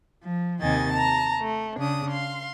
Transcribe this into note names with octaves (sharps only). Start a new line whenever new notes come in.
F3
D#2 C3 D#3 D#5 G#5 A6
A5 A#5
A3
C#3 D4 D#6
F5 C6